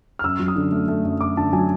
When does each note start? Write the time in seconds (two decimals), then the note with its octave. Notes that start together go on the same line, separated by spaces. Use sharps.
0.19 F6
0.24 F#2 E6
0.39 F#3
0.48 D#6
0.56 D3
0.72 A3
0.88 A3
1.05 F#2
1.21 F#2 D6
1.37 D3 A5
1.53 F#3 G#5